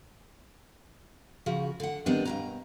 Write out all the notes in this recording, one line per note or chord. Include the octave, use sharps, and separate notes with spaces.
C#3 F3 F#4
D3 F#5
D#3 G3 B3 C4 D4
G2 B2 A#5